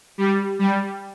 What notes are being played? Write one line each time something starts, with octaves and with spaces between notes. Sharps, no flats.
G3
G3